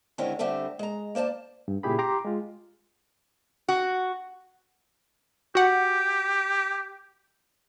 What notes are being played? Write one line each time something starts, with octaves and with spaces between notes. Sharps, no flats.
D3 D#3 G#3 C4 C#4 E4
D3 G3 A3 C4 A4
G#3 A#5
A#3 C5 D5 A5
G2
A#2 C#3 E4 G4 G#4 B5
G4 A#5 C6 D6
G#3 F4
F#4
F#4 G4 F#5